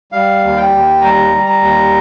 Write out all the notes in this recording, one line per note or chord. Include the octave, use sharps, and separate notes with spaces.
G3 F5
D#2
G5
D#2
G3 A#5
G3
A#5
D#2